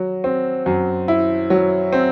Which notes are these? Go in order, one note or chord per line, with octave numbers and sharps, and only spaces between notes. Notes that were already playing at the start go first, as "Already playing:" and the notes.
Already playing: F#3
C4
F#2
E4
F#3
C4